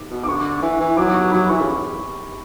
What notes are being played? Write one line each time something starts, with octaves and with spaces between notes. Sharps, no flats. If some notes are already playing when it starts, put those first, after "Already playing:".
Already playing: D6
B2
D6
D3 C#6
E3
E3
F#3 D6
D6
C#6
F#3 B5
E3 C#6
C#3